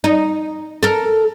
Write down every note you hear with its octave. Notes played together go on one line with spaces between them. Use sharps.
D#4
A4 A#4